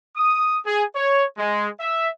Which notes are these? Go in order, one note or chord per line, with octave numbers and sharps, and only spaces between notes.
D#6
G#4
C#5
G#3
E5